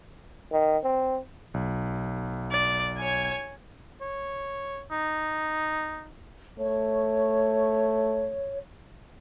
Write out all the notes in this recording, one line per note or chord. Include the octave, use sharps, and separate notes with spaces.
D#3
C4
B1
D5
C#5 G#5
C#5
D#4
A3 C#5